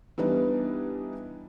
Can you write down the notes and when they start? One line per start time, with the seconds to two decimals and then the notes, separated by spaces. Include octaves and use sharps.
0.18 E3 G3 B3 D4 D#4